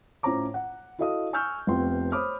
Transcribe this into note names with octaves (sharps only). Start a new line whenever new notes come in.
A2 C#4 F4 C5 A#5 D6
F#5
E4 F#4 A4 D#5 F5 D#6
G#5 C#6 E6 F6 G6
F1 B3 C4 F4 C6
C5 C#5 B5 D6 D#6 F6